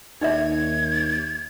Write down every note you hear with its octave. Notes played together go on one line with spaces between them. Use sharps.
D#2 D#4 D5 E5 G#6